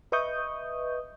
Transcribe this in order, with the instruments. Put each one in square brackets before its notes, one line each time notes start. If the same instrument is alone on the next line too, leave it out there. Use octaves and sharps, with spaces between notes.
[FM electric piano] B4 D#5 E5 C#6 D#6 G6